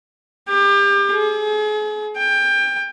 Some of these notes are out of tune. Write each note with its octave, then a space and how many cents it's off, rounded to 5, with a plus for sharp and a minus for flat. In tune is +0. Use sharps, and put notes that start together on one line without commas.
G4 +30
G#4 +40
G5 +25